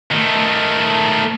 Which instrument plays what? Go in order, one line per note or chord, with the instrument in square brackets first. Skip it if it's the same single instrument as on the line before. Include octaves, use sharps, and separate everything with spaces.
[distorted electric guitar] D#3 A3